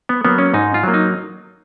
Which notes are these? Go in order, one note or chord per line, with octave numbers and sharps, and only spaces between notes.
B3
F#3 A#3 B3
C#4
G#2 D#4
F4
F#3 A#3
D#4